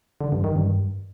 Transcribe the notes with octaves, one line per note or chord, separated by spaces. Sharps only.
D3
G2
D#3
G2